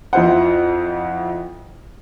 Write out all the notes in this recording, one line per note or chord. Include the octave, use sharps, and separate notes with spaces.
F2 E4 F4 C5 F#5